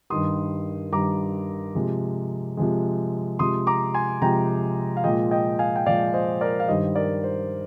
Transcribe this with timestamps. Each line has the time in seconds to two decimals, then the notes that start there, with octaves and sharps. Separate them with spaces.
0.10 G2 D#3 G3 C6 D#6
0.92 G2 D#3 G3 A#5 D6
1.75 C3 F3 G#3
2.57 C3 F3 G#3
3.39 C3 F3 G#3 C6 D#6
3.67 A#5 D6
3.94 G#5 C6
4.22 C3 F3 G#3 G5 A#5
4.97 F5
5.04 A#2 F3 G#3 D#5 G5
5.31 D#5 G5
5.59 F5 G#5
5.76 G5
5.86 A#2 F3 G#3 D5 F5
6.14 C5 D#5
6.41 A#4 D5
6.60 F5
6.68 G2 D#3 G3 C5 D#5
6.96 A#4 D5
7.24 C5